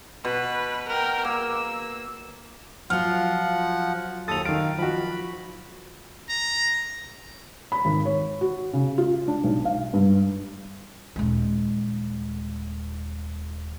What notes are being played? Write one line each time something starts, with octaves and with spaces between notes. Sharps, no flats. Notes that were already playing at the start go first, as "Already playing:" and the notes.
B2 B4
A#4 G5
A#3 E6
F3 F#3 F4 F#5 F6
D#2 A4 D#6 A6 F7
D#3 F5 D7
F3 F#4 B5
A#5
B5
G#1
C#5
F#4
C#3
F4
D4
B1
F5
G2
D#1 G#3